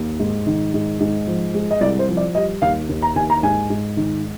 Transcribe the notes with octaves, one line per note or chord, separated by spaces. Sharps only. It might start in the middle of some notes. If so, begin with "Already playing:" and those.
Already playing: D#2
G#2
D#3
G#2
G#2
F3
G#3
D#5
C2 D5
C5
F3
D5
G3 D#5
D#2 F5
D#2
A#5
D#2 G#5
A#5
G#2 G#5
G#2
D#3